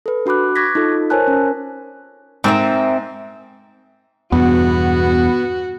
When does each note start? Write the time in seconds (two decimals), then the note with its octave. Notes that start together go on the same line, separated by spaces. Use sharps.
0.06 A4 B4
0.26 D4 F#4 B5 D6 F#6
0.56 C#6 D6 F#6 G#6 A#6 B6
0.75 D#4 F4 A4
1.10 A#4 C5 C#5 G#5 A5 F#6
1.28 C#4
2.44 G#2 C4 A#4 E5
4.32 E2 G2 B2 B3 F#4